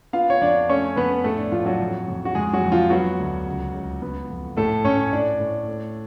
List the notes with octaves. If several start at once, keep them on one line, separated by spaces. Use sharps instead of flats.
B3 F4 F5
C#5
F2 D4 D5
A3 C#4 C#5
F2 B3 B4
A2 A3 A4
D4
A2 F3 F4
F#3 F#4
F2
F2
F#4
F2 G#3 G#4
F#3 F#4
F2
F3 F4
F#3 B3 F#4
D2
C#2
C#2
B3
F2
A2 A3 A4
A2 C#4 C#5
A2 D4 D5
A2
A3